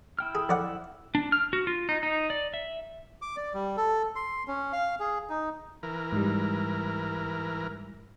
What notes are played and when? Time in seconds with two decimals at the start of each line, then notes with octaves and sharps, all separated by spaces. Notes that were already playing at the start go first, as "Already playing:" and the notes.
0.19 E4 G5 F6
0.35 G#4
0.49 F2 D5 F#5
1.15 D4
1.32 F6
1.53 F#4
1.67 F4
1.89 D#4
2.03 D#4
2.30 D5
2.54 E5
3.22 D6
3.37 D5
3.54 G3
3.77 A4
4.16 C6
4.48 C#4
4.73 F5
5.00 G#4
5.30 D#4
5.83 E3 A#4
6.13 G#2 G3